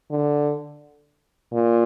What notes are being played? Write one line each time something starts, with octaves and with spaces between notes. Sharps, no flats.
D3
A#2